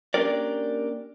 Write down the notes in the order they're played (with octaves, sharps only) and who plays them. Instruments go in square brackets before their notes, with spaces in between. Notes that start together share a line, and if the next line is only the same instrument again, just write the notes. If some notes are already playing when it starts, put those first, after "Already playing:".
[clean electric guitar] A#3 C#4 D4 G4 A#4 D5